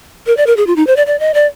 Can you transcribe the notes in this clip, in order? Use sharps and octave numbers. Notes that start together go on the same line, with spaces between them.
A#4
D5
A#4
G#4
F4
D#4
C5
D5
D5
D#5
D5